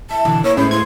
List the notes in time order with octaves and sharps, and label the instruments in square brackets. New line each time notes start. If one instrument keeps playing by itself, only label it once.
[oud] E4 [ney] A5
[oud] B2 [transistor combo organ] D3 E3
[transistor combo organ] A#3 E4 [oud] B3 [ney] C#5
[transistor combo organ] A2 G#3 [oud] B3 E4 C5 [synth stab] C#4 [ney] B5
[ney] C6 [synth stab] G#6